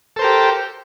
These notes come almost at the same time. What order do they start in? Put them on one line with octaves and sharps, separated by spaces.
A4 C5 A#4 G4